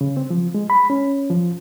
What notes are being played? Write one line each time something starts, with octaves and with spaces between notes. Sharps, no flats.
C#3
C4
F3
G#3
B5
C#4
F3